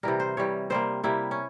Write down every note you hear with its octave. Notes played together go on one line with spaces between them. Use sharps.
C3 E3 G3 A#4
C5
C3 E3 G3 C#5
C3 G3 A#3 C5
C3 G3 A#3 E4
C#4